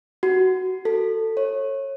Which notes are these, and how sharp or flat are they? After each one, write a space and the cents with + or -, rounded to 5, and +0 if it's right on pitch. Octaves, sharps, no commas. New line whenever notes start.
F#4 +10
A4 +15
C#5 -25